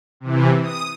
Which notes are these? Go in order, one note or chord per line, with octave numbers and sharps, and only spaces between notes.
C3 E3
D#6